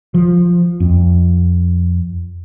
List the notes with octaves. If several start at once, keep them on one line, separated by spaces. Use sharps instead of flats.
F3
F2